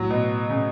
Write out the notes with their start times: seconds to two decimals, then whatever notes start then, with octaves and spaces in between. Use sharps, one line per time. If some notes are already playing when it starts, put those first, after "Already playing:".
Already playing: A2 F#3
0.10 B2
0.50 C#3